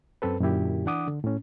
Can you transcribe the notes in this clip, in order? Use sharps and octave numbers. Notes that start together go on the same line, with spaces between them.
F#2 C4 A4 B4
F#2 A#2 D3 E4 G4
E3 D4 F#5 D6 D#6
D3
A2 C#4